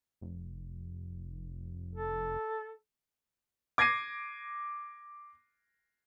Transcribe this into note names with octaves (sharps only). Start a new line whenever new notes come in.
F1
A4
D6 G#6 A#6 C7 D#7